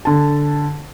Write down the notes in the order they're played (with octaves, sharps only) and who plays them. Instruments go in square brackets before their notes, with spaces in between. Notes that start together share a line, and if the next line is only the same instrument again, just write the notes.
[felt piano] D3 A5